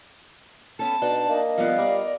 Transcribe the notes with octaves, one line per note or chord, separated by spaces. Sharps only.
B3 C#4 A4 A5
B2 D4 D#4
A#3 D#5
F3 G3 B3 F5
G3 A#4 D5